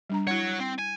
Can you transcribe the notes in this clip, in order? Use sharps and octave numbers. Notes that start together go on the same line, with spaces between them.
G3 D4 A#5
E4 F#4 C#5 F#5
C4
G#5